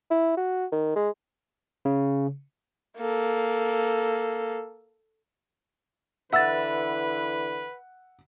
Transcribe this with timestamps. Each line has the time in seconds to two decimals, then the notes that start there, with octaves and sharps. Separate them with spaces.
0.11 E4
0.37 F#4
0.72 D#3
0.96 G#3
1.85 C#3
2.98 A#3 A4
6.33 D3 E3 E4 B4 E5 F#5 E6 A6